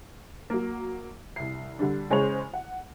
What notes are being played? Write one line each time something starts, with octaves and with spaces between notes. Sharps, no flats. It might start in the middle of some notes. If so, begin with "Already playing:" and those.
F#3 A#3
C2 C7
D3 G3 D4
C#3 G#3 C5 C#5 F7
F#5